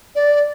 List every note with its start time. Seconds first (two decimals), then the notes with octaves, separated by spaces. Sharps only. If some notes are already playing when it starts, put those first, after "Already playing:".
0.15 D5